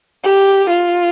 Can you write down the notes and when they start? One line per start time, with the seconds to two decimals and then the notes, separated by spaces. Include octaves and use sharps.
0.24 G4
0.71 F4